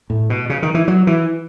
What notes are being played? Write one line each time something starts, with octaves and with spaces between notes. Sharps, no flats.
A2
B2
C#3
D#3
E3
F#3
E3